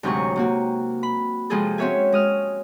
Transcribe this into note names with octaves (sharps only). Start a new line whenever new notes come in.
D2 G#2 C3 F#3 G#5 C#6
C3 A#3 F#4
B5
C3 F3 G#3 F4 G#4 A4
C4 C#4 F#4 C#5 E5 G#5
G#3 D#6 F6